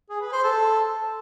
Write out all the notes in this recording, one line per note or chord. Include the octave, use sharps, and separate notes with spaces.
G#4
B4
C5
A4